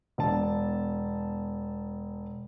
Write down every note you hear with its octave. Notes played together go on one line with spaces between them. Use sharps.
E1 A5